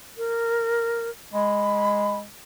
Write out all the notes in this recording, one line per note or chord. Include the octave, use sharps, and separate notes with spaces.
A#4
G#3 B5